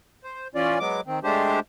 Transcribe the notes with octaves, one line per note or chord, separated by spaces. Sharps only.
C5
E3 C#4 F4 D5
F#3 G#3 B3 D6
D#3 C4
G#3 A3 D4 G4 C5